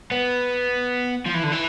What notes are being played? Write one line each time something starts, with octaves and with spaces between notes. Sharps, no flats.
B3
F3
E3
D3
E3